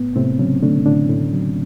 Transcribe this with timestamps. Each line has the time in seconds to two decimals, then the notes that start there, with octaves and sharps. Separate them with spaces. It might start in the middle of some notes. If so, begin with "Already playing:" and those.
Already playing: A2 B3
0.16 A2 C3 C4
0.39 C#3 F#3 C#4
0.63 D3 A3 D4
0.86 A2 D3 D4
1.09 A2
1.33 F#3